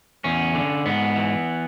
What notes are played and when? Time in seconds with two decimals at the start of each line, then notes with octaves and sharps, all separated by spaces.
0.24 E2 C#4
0.55 D3
0.86 G#2 B3
1.16 E3